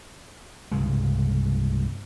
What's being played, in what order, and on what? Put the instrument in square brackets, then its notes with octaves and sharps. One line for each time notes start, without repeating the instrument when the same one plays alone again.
[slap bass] C2 G2 C#3 G#3